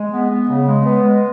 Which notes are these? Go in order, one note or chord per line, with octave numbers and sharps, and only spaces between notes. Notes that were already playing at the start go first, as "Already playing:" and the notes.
Already playing: G#3
B3
B3
C#3
G#3
B3
G#3